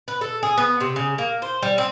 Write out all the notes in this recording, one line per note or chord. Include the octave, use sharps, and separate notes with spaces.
B4
A4
G#4
B3
C3
C#3
A#3
C5
G3
C4